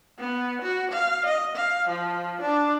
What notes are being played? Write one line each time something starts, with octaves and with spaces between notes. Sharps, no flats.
B3
F#4
F5
D#5
F5
F3
D4